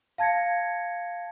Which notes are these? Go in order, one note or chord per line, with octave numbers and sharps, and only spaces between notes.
F5 A5 G#6 A#6 C#7